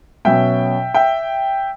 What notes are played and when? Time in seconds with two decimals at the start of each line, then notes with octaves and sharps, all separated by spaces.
0.25 B2 F#3 C#4 E5 G5
0.94 E5 G5